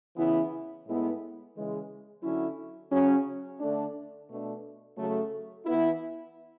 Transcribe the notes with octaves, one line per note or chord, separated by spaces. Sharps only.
C#3 E3 B3 E4
A2 G#3 B3 E4
C#3 E3 G#3
D3 F#3 C#4 E4
C#3 F#3 C#4
D3 A3 D4
B2 A3 D4
C#3 F#3 A3
E3 B3 E4